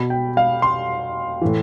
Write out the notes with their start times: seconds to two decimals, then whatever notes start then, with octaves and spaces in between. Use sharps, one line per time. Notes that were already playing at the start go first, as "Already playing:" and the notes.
Already playing: B2 B5
0.10 G5
0.37 F5
0.62 C6
1.41 A2 E3